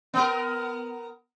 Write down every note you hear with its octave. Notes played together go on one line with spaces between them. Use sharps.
B3 A#4